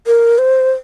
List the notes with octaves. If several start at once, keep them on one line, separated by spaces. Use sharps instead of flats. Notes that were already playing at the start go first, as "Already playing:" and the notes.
A#4
C5